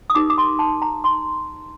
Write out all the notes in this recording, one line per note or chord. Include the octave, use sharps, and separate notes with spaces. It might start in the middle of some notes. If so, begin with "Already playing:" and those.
D#6
D#4 G4 A#4 D6
D6
C6
A5
A#5
C6